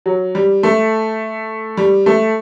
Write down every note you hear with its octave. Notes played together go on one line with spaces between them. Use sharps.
F#3
G3
A3
G3
A3